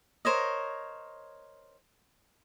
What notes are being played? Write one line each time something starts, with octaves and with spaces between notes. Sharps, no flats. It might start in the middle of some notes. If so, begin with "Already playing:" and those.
A#4 C5 C#5 D#5